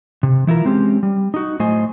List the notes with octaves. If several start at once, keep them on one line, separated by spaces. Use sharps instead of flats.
C3
E3 E4 F4 A#4
G#3 C4 C#4 G4
G3
D#4 F#4
A2 F#3 A3 C5 D#5 G#5